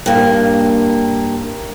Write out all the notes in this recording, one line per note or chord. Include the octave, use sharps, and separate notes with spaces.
G2 A#3